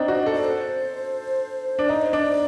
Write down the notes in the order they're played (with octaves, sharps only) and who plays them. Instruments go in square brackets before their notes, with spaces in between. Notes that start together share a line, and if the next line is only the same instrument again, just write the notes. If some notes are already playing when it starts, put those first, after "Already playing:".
Already playing: [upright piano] C4 D4 D#4 [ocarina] C5
[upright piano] F#4
[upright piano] A4 [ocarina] D#5
[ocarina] D5
C5
[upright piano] D4
[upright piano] D#4 [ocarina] D5
[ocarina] C5
[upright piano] D4 [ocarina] D5